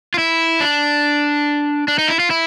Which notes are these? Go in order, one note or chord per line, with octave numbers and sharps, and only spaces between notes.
F4
E4
D4
D4
D#4
E4
F4
E4